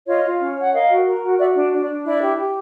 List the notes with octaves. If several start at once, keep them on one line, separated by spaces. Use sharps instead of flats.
F4 C#5 D#5
F4
C#4
C#5
F#5
A#4 D#5 F5
F#4
A#4
F#4
F#4 D5 E5
D4
D4
D5
D4
E4 D5
G4
G4